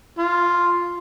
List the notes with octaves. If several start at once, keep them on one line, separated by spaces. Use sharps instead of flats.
F4